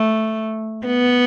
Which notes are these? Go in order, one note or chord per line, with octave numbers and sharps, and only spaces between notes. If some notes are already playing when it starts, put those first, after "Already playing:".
Already playing: A3
B3